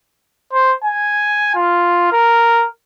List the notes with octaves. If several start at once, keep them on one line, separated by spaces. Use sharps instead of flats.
C5
G#5
F4
A#4